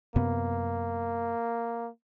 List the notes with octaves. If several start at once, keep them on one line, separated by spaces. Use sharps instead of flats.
F#2 C3 A#3 B3